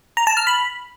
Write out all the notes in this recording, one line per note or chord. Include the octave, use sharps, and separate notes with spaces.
A#5
A5
F6
B5